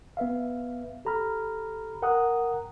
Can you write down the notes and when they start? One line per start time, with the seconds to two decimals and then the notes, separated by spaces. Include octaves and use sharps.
0.17 B3 B4 E5 F5
1.05 G4 A4 A#5 B5 F6
2.02 A#4 F#5 G5 A#5 D#6 F#6